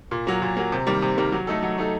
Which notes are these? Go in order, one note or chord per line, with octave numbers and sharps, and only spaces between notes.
A#2
F#3 A#3
A#2
F#3 A#3
C3
D#3 G3 A#3
C3
D#3 G3 A#3
F#3
A3 D#4 A4
F#3
A3 D#4 A4